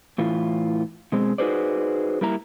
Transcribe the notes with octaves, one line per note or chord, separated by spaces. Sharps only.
A2 E3 F4
B2 G#3 C4
D#4 F#4 G#4 B4 C5 D5
G3 A#3 E4 A#5